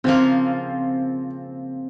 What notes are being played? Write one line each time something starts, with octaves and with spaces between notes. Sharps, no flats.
C#3 F3 A#3 C4 F4